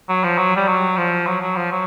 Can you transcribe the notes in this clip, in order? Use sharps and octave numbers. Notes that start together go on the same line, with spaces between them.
F#3
F3
F#3
G3
F#3
F3
F#3
F#3
F3
F#3